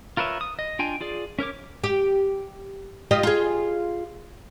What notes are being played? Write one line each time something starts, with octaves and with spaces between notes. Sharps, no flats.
F4 A#4 B4 C#5 E5
D#6
D#5
D4 F4 G5 G#5
F4 G#4 D5
C#4 A#4 C#5 D6
G4
F4 G4 D#5
F4 G#4